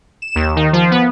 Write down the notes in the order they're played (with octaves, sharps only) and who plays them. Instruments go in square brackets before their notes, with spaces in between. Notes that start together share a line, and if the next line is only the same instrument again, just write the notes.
[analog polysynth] E7
D#2
D#3
F3
B3